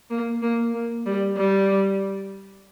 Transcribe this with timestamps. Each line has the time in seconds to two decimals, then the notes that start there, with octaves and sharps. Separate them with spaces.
0.10 A#3
0.42 A#3
0.74 A#3
1.06 G3
1.37 G3